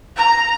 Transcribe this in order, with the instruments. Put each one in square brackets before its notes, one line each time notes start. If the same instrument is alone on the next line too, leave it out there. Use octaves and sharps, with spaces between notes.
[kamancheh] A#5